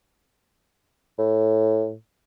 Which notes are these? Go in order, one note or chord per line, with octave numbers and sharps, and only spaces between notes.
A2